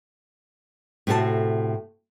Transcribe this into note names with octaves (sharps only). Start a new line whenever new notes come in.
A2 C3 F#4 A4 A#4 A5